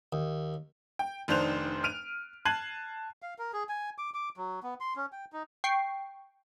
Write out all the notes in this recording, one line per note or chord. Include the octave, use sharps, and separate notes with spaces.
D#2
G5
F1 D#3 D4 C5 F#6 F7
F6 D7 D#7 F7
A5 F#6 G#6 C7 D#7 F#7
F5
A#4
G#4
G#5
D6
D6
F#3
B3
C6
C#4
G5
D#4
G5 C#6 C7